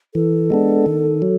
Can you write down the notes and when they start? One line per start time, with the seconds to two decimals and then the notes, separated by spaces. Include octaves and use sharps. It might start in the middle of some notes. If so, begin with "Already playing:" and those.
0.14 E3 A4
0.50 G#3 B3 D4
0.86 D#3
1.22 F#3